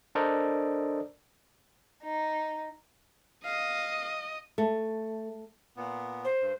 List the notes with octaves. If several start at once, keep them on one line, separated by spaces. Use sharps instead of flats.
D4 A4 A#4 C5 D5 D#5
D#4
D#5 F5
A3
A#2 B3
C5
G2